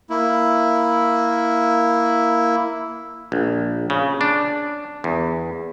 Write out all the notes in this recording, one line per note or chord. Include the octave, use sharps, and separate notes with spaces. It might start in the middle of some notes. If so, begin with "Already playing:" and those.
A#3 E4
A#1
C#3
D4
E2